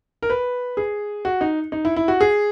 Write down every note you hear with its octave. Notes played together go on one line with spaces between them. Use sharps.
A#4
B4
G#4
F#4
D#4
D#4
E4
E4
F#4
G#4